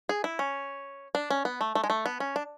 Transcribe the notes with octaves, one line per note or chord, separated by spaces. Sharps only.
G#4
E4
C#4
D4
C#4
B3
A3
A3
G#3
A3
B3
C#4
D4